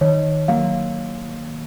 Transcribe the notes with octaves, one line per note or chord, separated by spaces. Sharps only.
D#3 C#5
F#3 A#3 F5